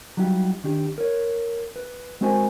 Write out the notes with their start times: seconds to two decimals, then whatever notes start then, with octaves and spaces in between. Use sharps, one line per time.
0.17 F#3 G3 D#4 F4 G4
0.64 D#3 D4 G4
0.98 A#4 C#5
1.76 B4
2.21 G#3 C4 F#4 A#4 C5 G#5